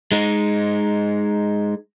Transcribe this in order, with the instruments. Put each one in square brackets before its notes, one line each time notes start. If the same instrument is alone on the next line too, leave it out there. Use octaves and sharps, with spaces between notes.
[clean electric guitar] G#3 D#4